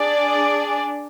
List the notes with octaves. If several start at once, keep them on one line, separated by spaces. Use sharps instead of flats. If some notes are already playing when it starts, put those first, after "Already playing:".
Already playing: D4 G#4 D5